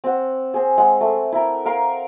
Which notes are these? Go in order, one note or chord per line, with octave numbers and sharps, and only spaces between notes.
C4 F#5
C4 G#4
G#3 F#5
A3
E4 A#4
A#4 F5 C6